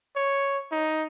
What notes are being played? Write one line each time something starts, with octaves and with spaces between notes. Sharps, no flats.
C#5
D#4